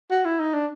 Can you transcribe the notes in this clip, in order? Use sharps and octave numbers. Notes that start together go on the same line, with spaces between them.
F#4
E4
D#4
D4